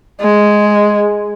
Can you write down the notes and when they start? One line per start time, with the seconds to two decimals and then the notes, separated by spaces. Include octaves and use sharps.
0.21 G#3